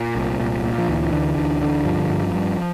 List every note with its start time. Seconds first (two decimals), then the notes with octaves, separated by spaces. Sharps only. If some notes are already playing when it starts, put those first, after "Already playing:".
Already playing: A#2
0.16 C2
0.40 A#2
0.64 A#2
0.78 F3
0.89 D2 E3
1.13 D3
1.37 D2
1.62 D3
1.85 G2 F3
2.10 G2
2.34 G2